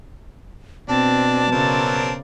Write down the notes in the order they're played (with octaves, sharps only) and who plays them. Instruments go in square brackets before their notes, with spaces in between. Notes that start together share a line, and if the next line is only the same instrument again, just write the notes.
[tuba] B2 [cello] C4 [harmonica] D4 [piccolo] A5
[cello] C#3 D5 [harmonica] F#3 C4 A#4